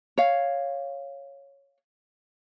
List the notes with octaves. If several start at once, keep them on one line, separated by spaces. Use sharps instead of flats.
C#5 F5